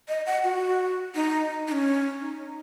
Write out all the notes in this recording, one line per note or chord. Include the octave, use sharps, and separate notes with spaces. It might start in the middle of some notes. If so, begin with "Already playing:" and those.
D#5
F#5
F#4
D#4
D#4
C#4
D#4